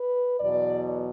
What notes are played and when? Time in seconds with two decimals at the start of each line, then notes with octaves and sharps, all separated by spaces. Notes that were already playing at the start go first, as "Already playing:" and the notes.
Already playing: B4
0.40 E2 B2 F#3 D5